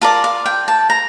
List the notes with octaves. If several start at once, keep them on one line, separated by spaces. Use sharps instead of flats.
F4 A#4 D5 A5
F5
G5
A5
A#5